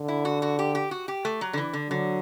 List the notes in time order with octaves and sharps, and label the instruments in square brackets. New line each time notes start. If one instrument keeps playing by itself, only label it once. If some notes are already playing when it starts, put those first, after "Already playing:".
Already playing: [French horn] D3
[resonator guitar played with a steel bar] E4
F#4
F#4
G4
G4
F#4
G4
A3
F#3
D3
E3
D3
[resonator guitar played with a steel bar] D3 [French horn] F#3